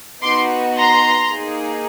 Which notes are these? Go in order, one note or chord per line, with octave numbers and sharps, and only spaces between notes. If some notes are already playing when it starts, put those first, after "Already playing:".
B3 D#4 F#4 C6 D6
A#5 C6
A#3 D#4 G#4